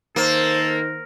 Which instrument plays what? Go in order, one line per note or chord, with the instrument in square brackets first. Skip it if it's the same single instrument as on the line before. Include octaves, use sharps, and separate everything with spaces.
[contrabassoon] D#3 [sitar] A#3 [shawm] A4 [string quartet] C5